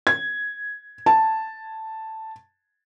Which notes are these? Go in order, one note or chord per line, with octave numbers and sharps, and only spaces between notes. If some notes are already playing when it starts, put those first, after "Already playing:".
G#6
A5